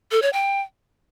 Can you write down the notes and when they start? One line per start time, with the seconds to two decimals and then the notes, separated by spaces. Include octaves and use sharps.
0.11 A4
0.22 C#5
0.33 G5